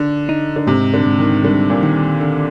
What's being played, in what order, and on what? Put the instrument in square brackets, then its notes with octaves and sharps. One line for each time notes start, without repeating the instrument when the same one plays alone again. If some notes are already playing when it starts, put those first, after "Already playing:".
Already playing: [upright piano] D3
[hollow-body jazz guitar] D#4
[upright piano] D3
[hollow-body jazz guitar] G#2 [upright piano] C3
[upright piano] D3
[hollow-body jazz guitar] G#2
[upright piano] D#3
[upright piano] D3 [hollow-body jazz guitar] G3
[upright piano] A#2
[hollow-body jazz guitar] D#3
D3